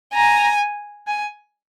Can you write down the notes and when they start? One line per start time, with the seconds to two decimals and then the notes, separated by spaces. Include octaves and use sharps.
0.14 G#5 A#5
1.07 G#5